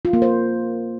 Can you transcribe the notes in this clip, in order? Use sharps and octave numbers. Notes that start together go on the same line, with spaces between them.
F4
A#3
C5